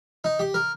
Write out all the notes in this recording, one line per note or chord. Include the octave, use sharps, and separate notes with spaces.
D#4
G4
A#4